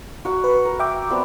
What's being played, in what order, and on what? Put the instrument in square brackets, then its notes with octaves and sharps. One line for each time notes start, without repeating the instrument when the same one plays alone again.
[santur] F#4 A#4 F#5
[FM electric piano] B4
[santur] A#4
[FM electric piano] E5 G5 D6
[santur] G3 B3 C4